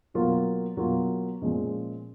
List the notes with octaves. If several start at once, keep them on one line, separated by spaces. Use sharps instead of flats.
B2 F#3 A#3 F4
B2 F#3 A#3 F4
A#2 F3 G#3 C#4